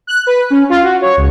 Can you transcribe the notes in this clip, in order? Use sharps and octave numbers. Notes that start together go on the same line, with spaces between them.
F#6
B4
C#4
F4
F#4
C#5
C#2